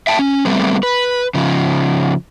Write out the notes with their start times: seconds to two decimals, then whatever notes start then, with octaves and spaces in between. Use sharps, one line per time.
0.07 E5 G5 A5
0.19 C#4
0.45 G3 A3 B3 C4
0.83 B4
1.34 C#3 F3